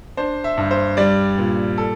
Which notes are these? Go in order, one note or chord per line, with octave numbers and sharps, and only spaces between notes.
D4 C5
E5
G2
C5
G3 D5
A#2
A4